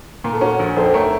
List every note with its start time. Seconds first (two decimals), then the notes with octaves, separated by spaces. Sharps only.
0.24 A#2 A#4
0.33 A4
0.41 C#4 F#4 A#4
0.59 A#1
0.76 F2 A4 C5
0.94 A3 A#4 C#5